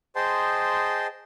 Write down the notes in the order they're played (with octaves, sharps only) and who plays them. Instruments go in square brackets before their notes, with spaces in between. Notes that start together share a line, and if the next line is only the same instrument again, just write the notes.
[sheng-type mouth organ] G#4 C5 D#5 G5 A5 C6